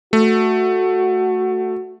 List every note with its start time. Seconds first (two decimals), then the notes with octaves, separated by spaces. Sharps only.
0.13 A3 F#4